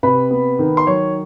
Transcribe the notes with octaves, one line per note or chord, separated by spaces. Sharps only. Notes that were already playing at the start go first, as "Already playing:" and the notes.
C3 B4 B5
B3
D#3
C6
F#3 C#5 C#6